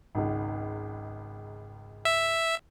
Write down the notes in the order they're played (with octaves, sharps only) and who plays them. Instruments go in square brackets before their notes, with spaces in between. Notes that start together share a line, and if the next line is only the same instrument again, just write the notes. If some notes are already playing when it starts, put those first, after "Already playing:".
[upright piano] G#1 C#2
[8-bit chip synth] E5